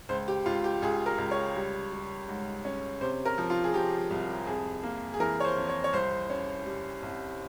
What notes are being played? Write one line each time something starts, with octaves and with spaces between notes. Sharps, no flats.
C#2 C5
G4
C#2 F4
G4
C#2 G#4
A#4
C#2
C#5
G3
G3
G#2
C#4
C3 C5
A#4
F3
F4
G#4
F3 G4
C2
F2 G#4
A#3
G#4
E3 A#4
C#5
C5
F2
C#5
C#5
C2 C5
C#4
G3
C2